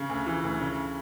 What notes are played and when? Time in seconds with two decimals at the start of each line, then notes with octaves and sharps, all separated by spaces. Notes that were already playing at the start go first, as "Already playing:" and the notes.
Already playing: C#3
0.09 D2
0.26 E3
0.44 D2
0.61 C#3